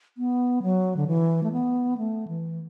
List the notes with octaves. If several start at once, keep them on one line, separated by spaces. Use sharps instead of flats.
B3
F#3
D3
E3
A3
B3
A3
E3